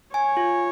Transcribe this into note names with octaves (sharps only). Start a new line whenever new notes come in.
C#5 G#5
F4